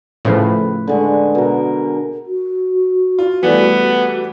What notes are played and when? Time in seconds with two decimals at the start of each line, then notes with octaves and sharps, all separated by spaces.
0.25 A2 C#3 F3 B4
0.87 D3 G#3 C#6
1.35 B2 A#4
2.26 F#4
3.19 F4
3.43 E3 G3 A3 B3